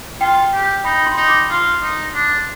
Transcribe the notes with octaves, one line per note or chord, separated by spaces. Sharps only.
F4 G5
G4
D#4 B5
C6
D#4
D6
F4 C6
D#4
D4